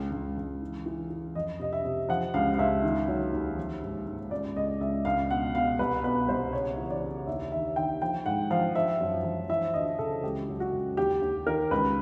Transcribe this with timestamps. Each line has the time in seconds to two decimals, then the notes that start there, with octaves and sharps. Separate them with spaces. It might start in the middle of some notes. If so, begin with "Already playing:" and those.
Already playing: C#2
0.11 C#2
0.37 C#2
0.62 E3
0.86 E3
1.10 E3
1.35 F2 D#5
1.59 C3 D#5
1.73 E5
1.85 C3
2.09 F3 F#5
2.34 C#2 F5
2.54 F5
2.59 C#2 E5
2.83 D#3
3.08 F#3
3.33 D#2
3.57 F3
3.83 G#2
4.06 G#2
4.31 C#2 D5
4.56 C#2 D#5
4.81 C#2 E5
5.05 C#2 F5
5.30 B2 F#5
5.55 B2 F5
5.79 C2 B4
6.03 B2 B4
6.29 C2 C5
6.53 C#3 C#5
6.78 E3
6.91 D5
7.03 C#3
7.27 D#2 E5
7.52 D#3 E5
7.76 D#3 G5
8.02 F3 G5
8.26 G#2 F#5
8.51 F3 F5
8.75 F3 E5
9.01 F#2
9.24 F3
9.50 E3 E5
9.74 D2 D#5
9.99 C#3 A4
10.23 C#2 G4
10.48 F#3
10.60 F#4
10.73 C#2
10.97 D#2 G4
11.22 D#2
11.46 D#3 A#4
11.71 C#2 B4